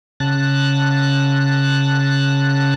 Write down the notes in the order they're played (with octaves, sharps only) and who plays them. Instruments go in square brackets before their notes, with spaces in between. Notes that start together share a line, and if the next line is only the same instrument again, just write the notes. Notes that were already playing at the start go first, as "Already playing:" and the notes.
[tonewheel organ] C#3 A5 F#6